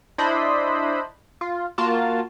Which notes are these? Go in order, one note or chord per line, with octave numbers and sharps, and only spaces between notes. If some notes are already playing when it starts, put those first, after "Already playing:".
D4 E4 C5 D#5 B5
F4
A#3 F4 F#4 A5